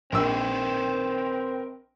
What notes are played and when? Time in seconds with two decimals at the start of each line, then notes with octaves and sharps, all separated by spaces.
0.12 A#1 C4 A#4 B4 D#5 E6